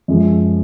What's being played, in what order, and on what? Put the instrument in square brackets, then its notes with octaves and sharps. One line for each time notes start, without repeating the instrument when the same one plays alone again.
[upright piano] F#2 F3 G#3